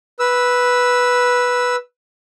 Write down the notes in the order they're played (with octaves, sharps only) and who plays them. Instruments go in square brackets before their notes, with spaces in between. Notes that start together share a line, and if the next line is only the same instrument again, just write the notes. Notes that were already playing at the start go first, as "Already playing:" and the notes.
[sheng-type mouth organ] B4 E6